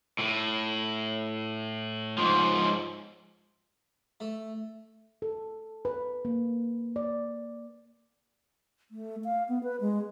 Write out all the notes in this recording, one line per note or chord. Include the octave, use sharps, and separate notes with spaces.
A2
G#2 F3
A3
A4
B4
A#3
D5
A3
F5
B3
B4
G#3